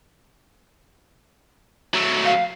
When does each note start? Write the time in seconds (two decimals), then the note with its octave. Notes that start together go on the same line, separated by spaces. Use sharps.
1.94 F#3 A3
2.25 F5